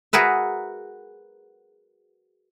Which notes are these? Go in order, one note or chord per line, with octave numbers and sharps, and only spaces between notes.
F#4 G#4 A#4 B4 E5